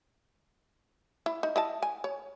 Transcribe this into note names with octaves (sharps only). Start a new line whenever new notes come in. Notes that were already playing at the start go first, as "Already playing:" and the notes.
E4
D#4
E4 D#5 A5
G#5
C#5